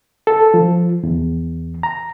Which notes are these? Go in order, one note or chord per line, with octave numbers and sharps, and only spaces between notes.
A4
F3
E2
A#5